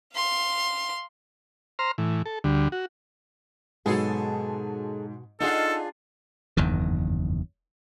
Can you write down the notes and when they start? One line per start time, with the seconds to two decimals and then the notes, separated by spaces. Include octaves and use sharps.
0.14 F5 C6
1.79 C5 A#5 C6 F6
1.98 A2 E3
2.26 A4
2.44 D2 D3 G3
2.72 F#4
3.86 G#2 B2 F#3 G#4 A4 B4
5.40 D4 D#4 F4 G#4 A4 D#5 F#5
6.57 F#1 E2 G2 D#3